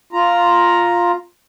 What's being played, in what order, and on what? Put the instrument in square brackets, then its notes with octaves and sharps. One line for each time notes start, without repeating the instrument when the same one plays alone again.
[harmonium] F4 A#5